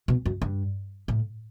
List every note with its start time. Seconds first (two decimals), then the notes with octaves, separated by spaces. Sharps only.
0.08 B2
0.26 F#2
0.42 G2
1.08 A2